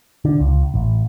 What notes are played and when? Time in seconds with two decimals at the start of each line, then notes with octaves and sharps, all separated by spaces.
0.25 D3
0.40 C#2
0.74 A1